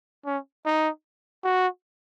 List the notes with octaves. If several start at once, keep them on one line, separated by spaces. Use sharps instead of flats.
C#4
D#4
F#4